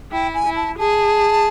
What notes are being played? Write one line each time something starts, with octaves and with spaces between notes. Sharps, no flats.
E4 G5
G#5
E4
A5
G#4 A5